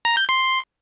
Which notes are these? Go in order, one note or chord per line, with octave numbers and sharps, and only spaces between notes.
A#5
G6
C6